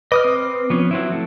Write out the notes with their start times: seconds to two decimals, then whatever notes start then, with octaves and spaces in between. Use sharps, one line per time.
0.12 B4 D#5 D6 D#6 F6
0.24 C4
0.70 F3 B3 C#4
0.91 F#3 C4 E4
1.12 A3